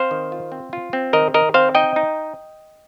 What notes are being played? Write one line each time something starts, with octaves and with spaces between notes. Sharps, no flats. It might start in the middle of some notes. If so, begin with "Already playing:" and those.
Already playing: C4 C5 F5
D#3
F4
C4
F4
C4
D#3 A#4 D#5
D#3 A#4 D#5
C4 C5 F5
D#4 D#5 G5
D#4